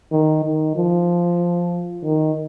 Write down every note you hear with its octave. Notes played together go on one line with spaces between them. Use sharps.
D#3
D#3
F3
D#3